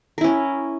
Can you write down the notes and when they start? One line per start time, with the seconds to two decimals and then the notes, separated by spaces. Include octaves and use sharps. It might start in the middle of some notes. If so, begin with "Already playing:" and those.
0.18 A#4
0.21 E4
0.24 C#4